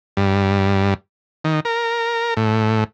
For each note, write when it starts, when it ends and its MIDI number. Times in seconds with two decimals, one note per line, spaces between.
0.17 0.94 43
1.44 1.60 51
1.65 2.34 70
2.37 2.84 45